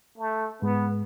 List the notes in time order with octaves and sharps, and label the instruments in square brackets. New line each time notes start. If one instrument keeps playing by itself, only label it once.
[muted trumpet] A3
[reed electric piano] G#2 G#3 [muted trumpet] B3